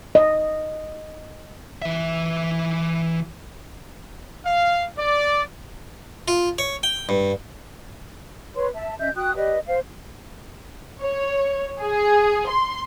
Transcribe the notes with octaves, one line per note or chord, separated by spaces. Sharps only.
D#5
E3 E5
F5
D5
F4
C#5
G5
G2
B4 C#5 C6
E5 A5
C#4 D#5 E5 G6
F#4 G5 D#6 F#6
G4 B4 D5 D#5
C5 F5
C#5
G#4
C6